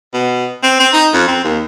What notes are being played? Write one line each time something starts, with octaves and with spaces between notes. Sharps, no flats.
B2
C4
C4
D#4
F2
C4
D#2